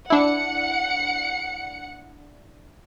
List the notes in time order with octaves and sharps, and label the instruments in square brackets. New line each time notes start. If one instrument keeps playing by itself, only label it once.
[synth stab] D4 E4 [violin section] F#5 C#7